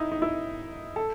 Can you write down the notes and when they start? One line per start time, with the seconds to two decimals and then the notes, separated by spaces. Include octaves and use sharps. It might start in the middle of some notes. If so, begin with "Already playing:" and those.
Already playing: D#4 E4
0.12 D#4
0.22 E4
0.96 A4